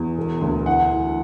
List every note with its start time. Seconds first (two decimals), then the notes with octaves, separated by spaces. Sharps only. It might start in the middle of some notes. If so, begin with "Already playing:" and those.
Already playing: E2
0.17 E1
0.41 D2
0.66 E3 F#5
0.92 E3